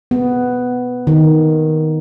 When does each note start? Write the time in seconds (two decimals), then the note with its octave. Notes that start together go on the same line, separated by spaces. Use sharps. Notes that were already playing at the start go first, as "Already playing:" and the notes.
0.11 B3
1.07 D#3